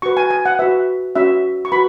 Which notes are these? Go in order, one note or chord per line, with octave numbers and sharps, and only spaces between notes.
F#4 B4 C#6
G#5
G#5
F#5
F#4 B4 E5
C#4 F#4 B4 E5
C#6
F#4 B4 B5